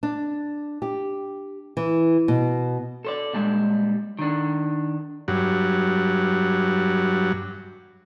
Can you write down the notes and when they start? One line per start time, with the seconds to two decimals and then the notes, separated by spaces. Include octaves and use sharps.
0.03 D4
0.82 G4
1.77 E3
2.28 B2
3.05 A4 C5 D5
3.33 A#2 G3 G#3 A5
4.19 D#3 D4
5.28 G2 F#3